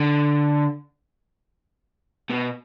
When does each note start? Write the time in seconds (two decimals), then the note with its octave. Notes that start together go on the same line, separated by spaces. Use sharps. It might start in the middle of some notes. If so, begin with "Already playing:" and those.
Already playing: D3
2.30 B2